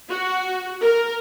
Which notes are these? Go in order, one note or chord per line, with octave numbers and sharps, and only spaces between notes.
F#4
A#4